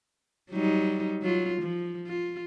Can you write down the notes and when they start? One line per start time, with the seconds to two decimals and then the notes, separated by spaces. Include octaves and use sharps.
0.51 F#3 G3 D#4
1.22 F#3 F4
1.62 F3
2.07 F4